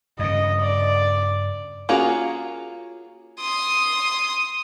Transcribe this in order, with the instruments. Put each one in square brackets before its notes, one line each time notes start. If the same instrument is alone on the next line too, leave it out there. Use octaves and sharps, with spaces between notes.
[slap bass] G2 C#3 [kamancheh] D#5
[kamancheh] D5
[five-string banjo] A#3 C#4 F4 F#4 G#4
[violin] C6 D#6